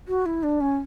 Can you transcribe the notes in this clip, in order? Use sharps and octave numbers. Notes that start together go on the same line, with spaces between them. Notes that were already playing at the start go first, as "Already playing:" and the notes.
F#4
E4
D4
C#4